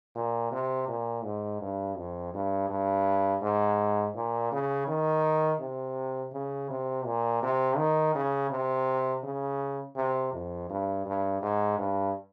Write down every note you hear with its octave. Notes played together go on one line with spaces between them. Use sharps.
A#2
C3
A#2
G#2
G2
F2
G2
G2
G#2
A#2
C#3
D#3
C3
C#3
C3
A#2
C3
D#3
C#3
C3
C#3
C3
F2
G2
G2
G#2
G2